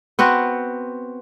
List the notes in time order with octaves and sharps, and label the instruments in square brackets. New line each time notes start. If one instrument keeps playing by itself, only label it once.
[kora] B3 C4 F#4